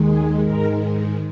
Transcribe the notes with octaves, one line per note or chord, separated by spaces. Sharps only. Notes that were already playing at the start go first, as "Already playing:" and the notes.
Already playing: D#2 D#3 G#3
G#4
G#2 D#3 G#3 A#4